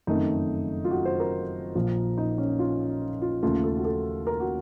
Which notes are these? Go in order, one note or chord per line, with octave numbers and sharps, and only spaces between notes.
F#1 F2 D#3 A3 D#4
F4
F#4
C5
A#4
A#1 A#2 F3
D#4
C#4
F4
F4
D#2 C#3 A3 F4
A4
F#4
A4
A#4
F#4